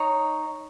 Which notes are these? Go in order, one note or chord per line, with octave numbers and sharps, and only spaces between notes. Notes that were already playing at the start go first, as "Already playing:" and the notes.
Already playing: D#4 C#5 A#5